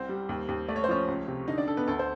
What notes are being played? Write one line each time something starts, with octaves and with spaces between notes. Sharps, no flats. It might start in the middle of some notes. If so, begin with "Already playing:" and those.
Already playing: C2 C4 C5
G3
D#2
D#2
A3 D5
C#5
C5
F3 C#4 C#5
C#2
C3
D3 D#4 D#5
D4 D5
D3 A4
B3 B4
D2 A4
C5